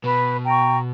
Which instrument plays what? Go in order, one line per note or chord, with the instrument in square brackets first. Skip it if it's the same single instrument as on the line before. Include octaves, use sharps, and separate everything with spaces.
[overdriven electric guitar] B2 [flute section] B4
[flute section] G5 A#5 C#6